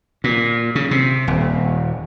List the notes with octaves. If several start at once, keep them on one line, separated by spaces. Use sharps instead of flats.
A#2
C#3
C3
D#1